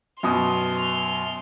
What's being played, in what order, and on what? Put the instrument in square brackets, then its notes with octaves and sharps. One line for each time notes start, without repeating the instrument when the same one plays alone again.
[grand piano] F#2 B2 D#6 [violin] C6 F7